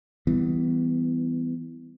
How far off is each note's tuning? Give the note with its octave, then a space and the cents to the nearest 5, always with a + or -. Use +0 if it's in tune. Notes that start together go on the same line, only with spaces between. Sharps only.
E3 +0 G3 +0 B3 +25